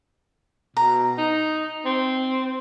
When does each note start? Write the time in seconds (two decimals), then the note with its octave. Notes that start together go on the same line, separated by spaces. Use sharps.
0.77 B2 A#5
1.18 D#4
1.85 C4